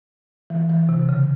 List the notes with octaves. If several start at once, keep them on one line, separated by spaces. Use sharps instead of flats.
E3
E3
C3
C#3